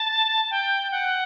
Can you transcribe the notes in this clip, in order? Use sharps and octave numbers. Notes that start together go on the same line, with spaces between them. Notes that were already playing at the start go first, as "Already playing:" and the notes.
Already playing: A5
G5
F#5